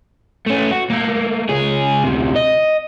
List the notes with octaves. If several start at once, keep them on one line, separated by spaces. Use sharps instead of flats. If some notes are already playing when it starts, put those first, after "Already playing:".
A3 C#4
F#4
A3 A#3
C#2 G#4
D2 C3
D#5